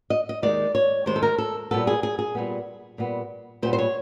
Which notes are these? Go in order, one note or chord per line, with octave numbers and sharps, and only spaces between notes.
D#5
D#5
D#2 D#3 G#3 D5
C#5
D#2 D#3 G#3 C5
A4
A#4
A4
A#2 G3 B3 A4
G#4
G#4
G#4
A#2 G3 B3
A#2 G3 B3
A#2 G3 B3 C5
C5
C#5